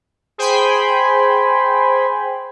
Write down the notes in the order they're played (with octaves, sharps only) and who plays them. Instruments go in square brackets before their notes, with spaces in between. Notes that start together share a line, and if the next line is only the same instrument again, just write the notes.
[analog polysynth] G#4 C5 G5 G#5 B5 C6